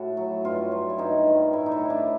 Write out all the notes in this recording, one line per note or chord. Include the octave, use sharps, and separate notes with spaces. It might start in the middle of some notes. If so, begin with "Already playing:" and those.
Already playing: A2 F#4
F#3
G2 F4
F#3
E4
G2 D#4
D#3
A2 E4
D#4
E4
A2
D4